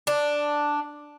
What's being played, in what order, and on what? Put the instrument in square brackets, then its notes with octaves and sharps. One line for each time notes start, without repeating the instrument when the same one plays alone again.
[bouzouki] D4